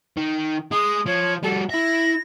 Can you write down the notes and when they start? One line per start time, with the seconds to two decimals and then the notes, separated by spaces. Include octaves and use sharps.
0.17 D#3
0.71 G#3 D#6
1.06 F3 C#5
1.43 G3 F#4 A4
1.69 E4 E5 A#6